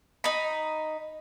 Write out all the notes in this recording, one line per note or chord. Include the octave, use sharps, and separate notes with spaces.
D#4 B5